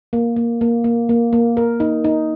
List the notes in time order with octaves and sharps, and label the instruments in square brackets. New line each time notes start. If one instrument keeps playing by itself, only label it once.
[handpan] A#3
A#3
A#3
A#3
A#3
A#3
A#4
D#4
D#4